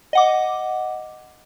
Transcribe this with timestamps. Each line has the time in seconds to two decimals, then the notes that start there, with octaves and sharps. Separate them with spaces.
0.13 D#5 F#5 D6